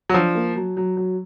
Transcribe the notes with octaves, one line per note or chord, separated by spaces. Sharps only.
F#3
F3 D4
A#3
F#3
F#3
F#3